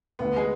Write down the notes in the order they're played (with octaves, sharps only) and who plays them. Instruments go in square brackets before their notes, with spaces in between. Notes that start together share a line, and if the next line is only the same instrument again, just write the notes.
[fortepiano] D2 [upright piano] B3
[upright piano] G#3